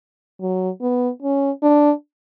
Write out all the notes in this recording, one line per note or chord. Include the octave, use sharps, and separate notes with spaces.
F#3
B3
C#4
D4